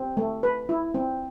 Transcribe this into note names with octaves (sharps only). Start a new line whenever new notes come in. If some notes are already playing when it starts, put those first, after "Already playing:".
Already playing: C4
A3
B4
E4
C4